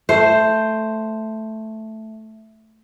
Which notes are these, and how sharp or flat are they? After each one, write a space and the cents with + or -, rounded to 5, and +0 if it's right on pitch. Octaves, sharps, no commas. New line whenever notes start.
A3 +0 C5 +0